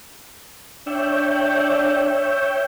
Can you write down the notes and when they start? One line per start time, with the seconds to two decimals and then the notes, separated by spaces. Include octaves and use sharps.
0.87 D4 C#5 E5 G5